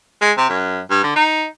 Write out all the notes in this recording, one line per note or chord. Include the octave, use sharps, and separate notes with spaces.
G#3
C3
F#2
G2
D3
D#4